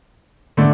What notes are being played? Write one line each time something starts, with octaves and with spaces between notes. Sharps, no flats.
D3 A3 D4